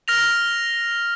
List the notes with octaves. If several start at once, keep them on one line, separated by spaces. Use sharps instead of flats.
F6 A#6 F7